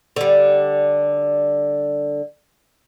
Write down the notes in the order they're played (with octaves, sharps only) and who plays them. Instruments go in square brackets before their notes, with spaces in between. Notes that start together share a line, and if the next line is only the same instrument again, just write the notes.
[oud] D3 G3